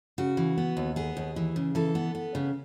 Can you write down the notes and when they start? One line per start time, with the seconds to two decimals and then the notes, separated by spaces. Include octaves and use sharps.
0.18 C#3 F#4
0.37 E3
0.58 B3
0.77 D#2
0.96 B3 G#4
1.17 D#2
1.36 E3
1.56 C#3
1.75 E3 A4
1.95 B3
2.15 B3
2.35 C#3